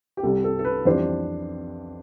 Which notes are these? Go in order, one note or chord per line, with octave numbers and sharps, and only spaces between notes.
G4
C2 C3 G3 A4
A4
A4
B4
F2 E3 G3 D4 C5